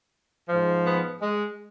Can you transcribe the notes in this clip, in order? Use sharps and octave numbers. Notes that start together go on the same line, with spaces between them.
G#2 F3
B3
G#3